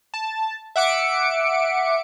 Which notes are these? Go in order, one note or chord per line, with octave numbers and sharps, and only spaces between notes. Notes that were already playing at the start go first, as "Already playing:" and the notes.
A5
E5 F#5 D6 C#7 D7